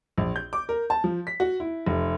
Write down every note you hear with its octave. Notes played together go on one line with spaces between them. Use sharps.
A#1
G6
D6
A#4
A5
F3
B6
F#4
E4
F1